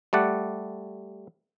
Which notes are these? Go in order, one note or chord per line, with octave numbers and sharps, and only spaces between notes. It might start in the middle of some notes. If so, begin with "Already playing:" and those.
G3 A3 D5 F#5